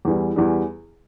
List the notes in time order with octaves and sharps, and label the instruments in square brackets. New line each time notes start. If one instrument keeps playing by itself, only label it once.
[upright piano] E2 E3 G3
E2 E3 G3